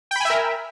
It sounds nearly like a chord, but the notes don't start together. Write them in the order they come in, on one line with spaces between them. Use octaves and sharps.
G5 B5 G#5 E5 A#4